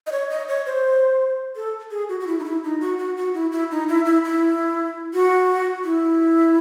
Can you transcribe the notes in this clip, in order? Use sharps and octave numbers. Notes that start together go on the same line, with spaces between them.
D#5
C#5
D#5
C#5
C5
A4
G#4
F#4
F#4
E4
D#4
E4
D#4
F#4
F#4
F#4
E4
E4
D#4
E4
E4
E4
F#4
E4